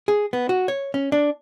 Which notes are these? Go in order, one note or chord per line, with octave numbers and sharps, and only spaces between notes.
G#4
B3
F#4
C#5
C#4
D4